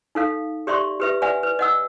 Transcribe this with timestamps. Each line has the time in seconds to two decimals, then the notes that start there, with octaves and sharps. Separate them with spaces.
0.15 D#4 A4 F5
0.67 G4 D5 E5 C6 C#6
1.00 G4 B4 E5
1.22 B4 D5 E5 F#5 G#5
1.43 B4
1.59 D#5 F#5 E6